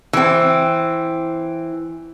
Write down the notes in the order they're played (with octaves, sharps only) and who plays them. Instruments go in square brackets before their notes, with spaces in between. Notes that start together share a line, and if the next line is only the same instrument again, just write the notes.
[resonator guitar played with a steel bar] E3 C4